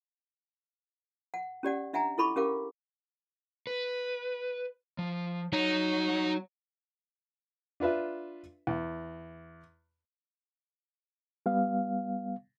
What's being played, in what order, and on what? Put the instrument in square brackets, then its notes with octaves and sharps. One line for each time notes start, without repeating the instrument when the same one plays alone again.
[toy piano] F#5
C#4 G4 D5 F#5
D4 E5 F#5 G#5 A#5
E4 A4 B5 C#6 D6
C#4 G4 A#4 F5 D6
[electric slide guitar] B4
F3
[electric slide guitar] F#3 C#5 [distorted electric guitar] D#4
[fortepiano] D4 F4 B4 E5
E2
[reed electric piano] G3 B3 F5